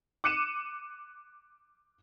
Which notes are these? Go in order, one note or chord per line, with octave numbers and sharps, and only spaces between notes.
D6 F#6 C#7 D#7 E7